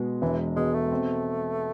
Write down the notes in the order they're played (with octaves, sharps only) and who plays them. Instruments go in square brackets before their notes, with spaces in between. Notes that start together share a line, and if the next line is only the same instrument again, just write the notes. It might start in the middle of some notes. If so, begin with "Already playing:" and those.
Already playing: [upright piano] B2 G#3
[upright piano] E1 [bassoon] E3
[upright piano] B2 [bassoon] G#3
[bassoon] A3
[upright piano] C4